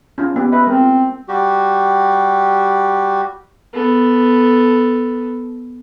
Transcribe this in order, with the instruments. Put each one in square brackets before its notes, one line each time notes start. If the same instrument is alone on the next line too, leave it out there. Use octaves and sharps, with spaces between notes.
[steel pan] C#4 F4 F5
A#3 B3 G4
[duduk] B4 [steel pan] D#5 E5
[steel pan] G#3 A#4 [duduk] C4
[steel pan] F4
[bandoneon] G3 F#4 G4
[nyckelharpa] B3 A4